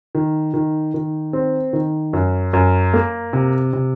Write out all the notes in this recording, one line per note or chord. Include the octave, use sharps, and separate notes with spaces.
D#3
D#3
D#3
C4
D#3
F#2
F#2
A#3
C3
C3